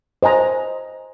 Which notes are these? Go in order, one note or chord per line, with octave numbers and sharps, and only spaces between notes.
C5 D#5 G#5 A#5